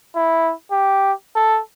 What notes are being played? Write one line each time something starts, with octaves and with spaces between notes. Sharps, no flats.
E4
G4
A4